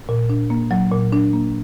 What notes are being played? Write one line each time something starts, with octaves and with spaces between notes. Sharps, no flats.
A#2
D4
A#3
F#3
A#2
D4
A#3